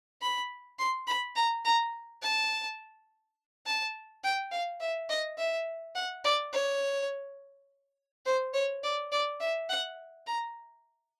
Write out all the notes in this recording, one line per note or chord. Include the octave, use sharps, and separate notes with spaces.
B5
C6
B5
A#5
A#5
A5
A5
G5
F5
E5
D#5
E5
F#5
D5
C#5
C5
C#5
D5
D5
E5
F#5
A#5